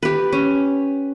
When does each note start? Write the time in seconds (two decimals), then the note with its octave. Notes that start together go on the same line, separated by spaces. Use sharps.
0.03 G4 B4
0.32 C#4